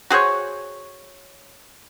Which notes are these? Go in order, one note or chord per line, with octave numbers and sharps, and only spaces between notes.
F#4 G#4 C5 C#5